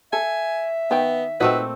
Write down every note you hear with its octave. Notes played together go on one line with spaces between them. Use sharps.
A4 E5 G#5
D#3 B3 G5
A#2 A3 C4 D#4 F#4 B4 D#5